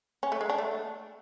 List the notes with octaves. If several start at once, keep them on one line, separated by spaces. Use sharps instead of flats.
C#4
A3
G#3
D4
A3